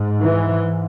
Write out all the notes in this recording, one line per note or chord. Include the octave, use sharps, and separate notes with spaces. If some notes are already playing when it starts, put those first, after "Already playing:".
Already playing: G#2
E3